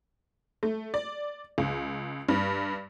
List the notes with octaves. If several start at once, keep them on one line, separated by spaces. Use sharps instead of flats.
A3
D5
C#2
G2